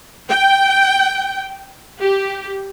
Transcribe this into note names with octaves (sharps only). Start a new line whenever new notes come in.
G5
G4